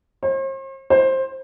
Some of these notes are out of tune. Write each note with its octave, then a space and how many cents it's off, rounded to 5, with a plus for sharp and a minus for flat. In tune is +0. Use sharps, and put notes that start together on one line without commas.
C5 +45
C5 +15